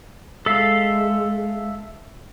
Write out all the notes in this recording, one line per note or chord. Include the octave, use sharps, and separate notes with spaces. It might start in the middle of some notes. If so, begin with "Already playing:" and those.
G#3 A4 E5 F5